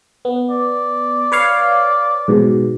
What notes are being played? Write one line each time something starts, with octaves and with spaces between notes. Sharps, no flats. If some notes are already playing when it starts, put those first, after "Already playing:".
B3
D5
B4 C#5 F5
G#2 B2